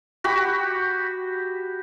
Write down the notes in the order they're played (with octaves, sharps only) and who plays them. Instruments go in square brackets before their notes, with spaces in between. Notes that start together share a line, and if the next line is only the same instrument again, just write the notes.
[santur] F#4 G4 B5